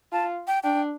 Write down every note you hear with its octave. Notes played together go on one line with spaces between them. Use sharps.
F4 A5
G5
D4 G5